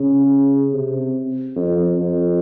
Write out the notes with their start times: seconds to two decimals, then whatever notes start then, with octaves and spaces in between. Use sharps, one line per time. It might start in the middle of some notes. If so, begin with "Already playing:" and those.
Already playing: C#3
0.73 C3
1.56 F2
1.99 F2